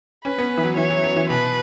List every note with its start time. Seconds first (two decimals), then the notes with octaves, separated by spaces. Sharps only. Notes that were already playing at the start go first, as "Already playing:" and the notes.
0.25 C#4 B4
0.38 B3
0.58 E3
0.64 F#3
0.77 E3 C#5
0.90 F#3
1.04 F#3
1.16 E3
1.29 B2 B4